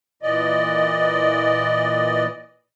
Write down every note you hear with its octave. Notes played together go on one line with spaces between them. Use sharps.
A#2 E3 D5 D#5